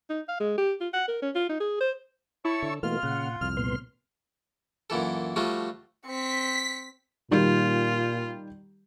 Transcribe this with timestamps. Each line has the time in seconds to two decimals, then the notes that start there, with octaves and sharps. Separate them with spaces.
0.10 D#4
0.29 F5
0.40 G#3
0.58 G4
0.81 F4
0.93 F#5
1.08 A#4
1.22 C#4
1.35 F4
1.49 D#4
1.60 G#4
1.81 C5
2.45 E4 C#5 A5 C#6 E6
2.62 D3
2.83 B2 E3 A3 A#3 F4 F6
3.03 A#2 C#3 F#5
3.41 C2 F2 F6
3.57 A#2 B3 C6
4.90 F#2 A#2 E3 A4
5.36 F3 G3 A3 F4 F#4
6.07 C4 B6 C#7
7.31 A#2 D#3 G3 F4 G4